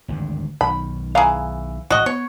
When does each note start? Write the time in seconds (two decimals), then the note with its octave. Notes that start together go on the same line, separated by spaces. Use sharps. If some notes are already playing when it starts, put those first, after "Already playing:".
0.08 G#1 D2 G2
0.61 B1 D#3 B5
1.15 E3 G#4 F5 A#5
1.90 A1 G#2 F#4 D#5
2.06 B3 C#5